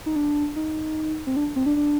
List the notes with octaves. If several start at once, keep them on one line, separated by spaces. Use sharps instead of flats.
D#4
D4
D#4
C4
D4
C4
D4
D4